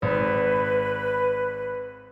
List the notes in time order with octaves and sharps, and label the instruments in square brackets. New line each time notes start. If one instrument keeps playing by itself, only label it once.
[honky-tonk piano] G#1 [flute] B4